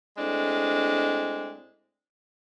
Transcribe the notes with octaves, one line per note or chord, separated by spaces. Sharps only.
A2 G#3 C4 D4